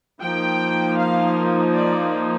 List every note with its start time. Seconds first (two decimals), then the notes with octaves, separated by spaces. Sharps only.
0.21 F3 A#3 D#4 G5
0.97 F5
1.73 D5